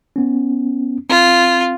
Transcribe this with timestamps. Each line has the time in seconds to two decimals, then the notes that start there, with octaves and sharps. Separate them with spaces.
0.16 B3 C#4
1.10 C4 F4